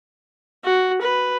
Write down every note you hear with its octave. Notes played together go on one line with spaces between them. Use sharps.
F#4
B4